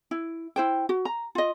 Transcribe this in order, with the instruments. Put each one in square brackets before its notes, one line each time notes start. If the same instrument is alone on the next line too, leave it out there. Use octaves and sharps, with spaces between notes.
[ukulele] E4
E4 C5 G5
F#4
A#5
F4 D#5